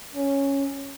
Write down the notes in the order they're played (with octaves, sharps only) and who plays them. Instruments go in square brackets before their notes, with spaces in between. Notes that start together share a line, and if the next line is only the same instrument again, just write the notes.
[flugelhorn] C#4